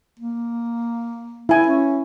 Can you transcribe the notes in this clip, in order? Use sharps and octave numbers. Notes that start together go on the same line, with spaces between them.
A#3
E4 G#5
C#4